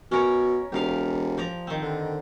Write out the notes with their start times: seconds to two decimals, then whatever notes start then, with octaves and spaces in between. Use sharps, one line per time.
0.11 B2 C#4 A#4 C#5
0.72 E1 G4 A#4 F5
1.38 F3 D5 A#5
1.67 D#3 C4
1.82 D3